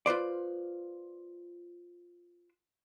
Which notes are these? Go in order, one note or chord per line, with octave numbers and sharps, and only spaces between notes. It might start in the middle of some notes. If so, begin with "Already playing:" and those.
F4 B4 C5 D5